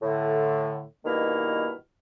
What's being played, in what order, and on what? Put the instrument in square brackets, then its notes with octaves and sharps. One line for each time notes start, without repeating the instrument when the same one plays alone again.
[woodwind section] A2 D3
G2 B2 D#3 A#3 E4 F6